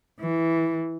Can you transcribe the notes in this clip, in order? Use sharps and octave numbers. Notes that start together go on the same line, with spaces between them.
E3